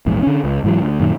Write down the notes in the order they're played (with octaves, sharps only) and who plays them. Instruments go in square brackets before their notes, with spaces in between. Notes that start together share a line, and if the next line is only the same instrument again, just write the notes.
[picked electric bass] A#1 E2 G#2
D3 C#4
C#2
G#2 E3 F#3
D2
F#2 A#2 D#3